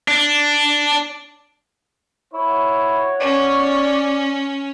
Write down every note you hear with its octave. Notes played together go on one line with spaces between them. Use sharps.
D4
E4 F#4 C#5
C#4 D5